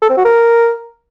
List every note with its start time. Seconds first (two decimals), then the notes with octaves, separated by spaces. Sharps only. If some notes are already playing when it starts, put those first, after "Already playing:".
0.02 A4
0.10 C4
0.17 F#4
0.25 A#4